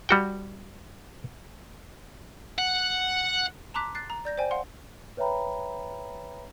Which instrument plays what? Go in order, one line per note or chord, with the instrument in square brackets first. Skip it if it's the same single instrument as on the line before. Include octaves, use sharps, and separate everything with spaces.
[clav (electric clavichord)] G3 F#4 G5
[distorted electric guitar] F#5
[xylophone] A5 A#5 C6 D6 F#6 B6
F#6 A6 C7
A#5
D5 G6 A#6
C5 D5 G5 G#5
F5 F#5 C6
[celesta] B4 C#5 E5 G5 A#5 B5